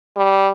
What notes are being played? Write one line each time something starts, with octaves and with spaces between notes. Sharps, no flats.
G3